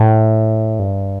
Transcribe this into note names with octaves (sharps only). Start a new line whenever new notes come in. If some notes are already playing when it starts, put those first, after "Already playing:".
Already playing: A2
G2